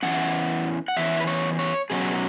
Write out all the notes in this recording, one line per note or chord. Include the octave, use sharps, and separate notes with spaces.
E2 E3 C#4 F#5
F#5
E2 E3 C#4 E5
B4
C#5
C#5
B2 F#3 C#4 G#4